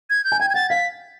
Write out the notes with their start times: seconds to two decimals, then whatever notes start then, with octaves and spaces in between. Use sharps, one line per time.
0.10 G#6
0.24 G6
0.32 G#5
0.40 G5 G#6
0.50 G#6
0.54 F#5 A6
0.70 F5 B6